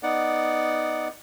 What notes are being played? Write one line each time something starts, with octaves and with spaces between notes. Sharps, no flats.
B3 D#4 D5 F#5